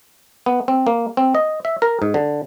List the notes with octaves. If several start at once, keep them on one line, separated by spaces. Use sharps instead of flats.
B3
C4
A#3
C4
D#5
E5
A#4
G#2
D3